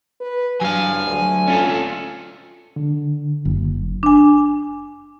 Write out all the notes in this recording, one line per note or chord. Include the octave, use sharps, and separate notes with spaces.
B4
G2 F#3 F5 G#5
D2
C#4 F4 A4
D3
F#1
D4 G#5